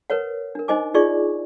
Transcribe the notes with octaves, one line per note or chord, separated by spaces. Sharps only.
A#4 B4 C#5 F#5
D4 A#4
D#4 C5 D#5 G#5 D6
D#4 F4 G#4 D5 C#6